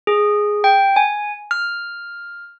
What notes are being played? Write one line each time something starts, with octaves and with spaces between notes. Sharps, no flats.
G#4
G5
G#5
F6